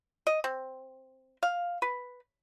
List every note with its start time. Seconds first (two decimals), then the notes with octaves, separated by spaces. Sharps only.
0.27 D#5
0.44 C4
1.43 F5
1.82 B4